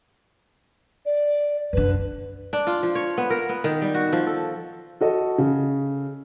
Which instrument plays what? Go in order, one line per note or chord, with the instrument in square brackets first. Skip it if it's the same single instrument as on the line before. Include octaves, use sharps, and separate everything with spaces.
[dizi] D5
[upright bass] F#2 D3 [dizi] B4
[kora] D4
F4
F3
C#5
B3
A#4
B3
D#3
G3
F#4
F3
A4
[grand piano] F#4 A4 D#5
C#3